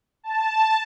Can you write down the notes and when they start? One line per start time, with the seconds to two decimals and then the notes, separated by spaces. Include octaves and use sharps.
0.23 A5